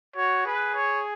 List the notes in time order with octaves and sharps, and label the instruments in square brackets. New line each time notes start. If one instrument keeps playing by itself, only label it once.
[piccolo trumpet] F#4 [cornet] C#5
[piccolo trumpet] G#4 [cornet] B4
[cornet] C#5